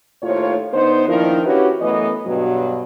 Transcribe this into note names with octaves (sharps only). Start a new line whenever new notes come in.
D#2 A2 F4 C5 C#5
D3 B3 D#4 C5
A#2 D#3 F3 D4 E4 A#4
C#4 E4 F#4 G4 B4 C#5
F#2 E3 A3 B3 D#5
G2 B2 F#3